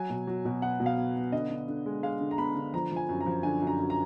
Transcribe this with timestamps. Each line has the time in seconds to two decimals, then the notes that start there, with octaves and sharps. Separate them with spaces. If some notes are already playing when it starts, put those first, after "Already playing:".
Already playing: F#3 G#5
0.10 B2
0.27 F#3
0.45 B2
0.62 B3 F#5
0.80 B2
0.86 F5
0.97 B3
1.16 B3
1.32 D3 D#5
1.50 D3
1.68 D3
1.86 G#3
2.03 G#3 F5
2.20 D3
2.31 A#5
2.38 B3 B5
2.55 D3
2.74 F3 A#5
2.92 F3 G#5
3.09 F#2
3.21 A#5
3.26 F3
3.43 D3 G#5
3.62 F#2
3.67 A#5
3.79 F#2
3.90 A#5